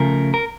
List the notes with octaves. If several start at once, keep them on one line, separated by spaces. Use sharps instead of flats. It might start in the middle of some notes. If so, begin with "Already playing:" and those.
Already playing: C#3 F3 A3 A#4
A#4